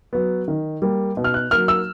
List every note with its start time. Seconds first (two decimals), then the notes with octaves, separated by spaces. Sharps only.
0.13 F#3 B3
0.48 D#3
0.82 G3 A#3
1.17 B2
1.24 F6
1.34 F#6
1.51 F#3 A#3 F6
1.68 E6